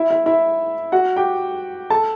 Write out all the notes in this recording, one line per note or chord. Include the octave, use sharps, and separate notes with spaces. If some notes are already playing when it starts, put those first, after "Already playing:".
Already playing: E4 E5
E4 E5
E4 E5
F#4 F#5
G4 G5
A4 A5